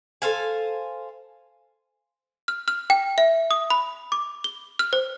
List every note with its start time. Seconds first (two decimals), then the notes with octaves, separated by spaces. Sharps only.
0.22 A4 C5 F5 G#5
2.48 F6
2.68 F6
2.90 G5
3.18 E5
3.51 D#6
3.70 B5
4.12 D6
4.44 G7
4.79 F6
4.93 C5